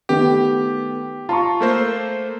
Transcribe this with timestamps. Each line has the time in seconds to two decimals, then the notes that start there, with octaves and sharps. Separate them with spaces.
0.09 D#3 A3 B3 G4
1.29 F4 A5 A#5 C#6
1.61 A3 A#3 C5